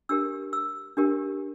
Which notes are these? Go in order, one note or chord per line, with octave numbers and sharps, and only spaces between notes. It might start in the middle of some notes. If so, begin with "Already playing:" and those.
D4 G4 A#4 E6
E6
D4 G4 A#4